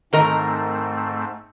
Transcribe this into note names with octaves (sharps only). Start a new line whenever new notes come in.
G#2 D#3 A3 C4 A#4 A#5